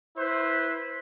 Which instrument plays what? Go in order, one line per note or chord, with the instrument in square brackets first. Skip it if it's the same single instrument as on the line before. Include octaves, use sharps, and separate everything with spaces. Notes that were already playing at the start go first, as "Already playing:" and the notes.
[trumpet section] E4 B4 C5